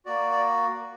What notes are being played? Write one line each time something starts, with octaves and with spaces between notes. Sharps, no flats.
A#3 F#4 D5
D5